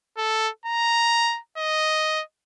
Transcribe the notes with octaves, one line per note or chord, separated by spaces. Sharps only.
A4
A#5
D#5